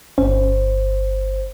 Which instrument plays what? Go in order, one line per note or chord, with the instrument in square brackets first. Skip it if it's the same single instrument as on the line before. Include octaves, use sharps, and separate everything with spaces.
[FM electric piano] G1 [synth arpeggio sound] C#4 [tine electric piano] C5